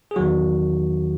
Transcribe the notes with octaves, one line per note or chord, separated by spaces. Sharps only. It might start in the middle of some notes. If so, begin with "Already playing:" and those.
G#4
E2 D#3 F#3 F#4